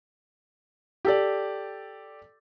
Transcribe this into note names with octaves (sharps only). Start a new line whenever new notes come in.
G4 A4 D5